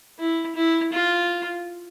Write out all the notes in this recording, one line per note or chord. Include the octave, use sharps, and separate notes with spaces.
E4
E4
F4